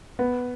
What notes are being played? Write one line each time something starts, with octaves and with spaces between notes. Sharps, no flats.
B3